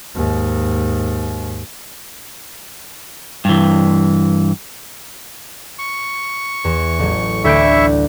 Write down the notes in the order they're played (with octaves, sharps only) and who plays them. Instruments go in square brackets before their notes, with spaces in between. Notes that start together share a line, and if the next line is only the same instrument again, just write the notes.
[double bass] D#2 G#2
[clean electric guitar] G2 E3
[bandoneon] C#6
[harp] E2
A1 F#3
[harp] D2 G6 D7 [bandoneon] E4 E5 C#6